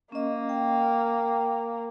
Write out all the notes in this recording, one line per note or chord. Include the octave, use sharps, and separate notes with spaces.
A#3 C#4 D#5
G5